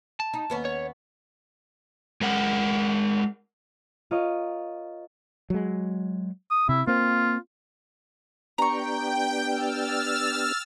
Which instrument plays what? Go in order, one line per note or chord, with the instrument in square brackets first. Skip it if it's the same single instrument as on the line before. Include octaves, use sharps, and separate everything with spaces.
[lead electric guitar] A5
[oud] D#4
D#2 B3 C#4
[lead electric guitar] C#5
[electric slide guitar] G#3 A#4 F#5
[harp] F4 A#4 C#5 D#5
[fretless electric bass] F#3 G#3
[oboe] D#6
[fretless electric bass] C3 [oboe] E4
[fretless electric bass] A#3 C4 [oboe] F4
[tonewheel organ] B3 D4 G4 [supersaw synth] G5 [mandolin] A#5 C#6
[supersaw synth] E6 F6 A6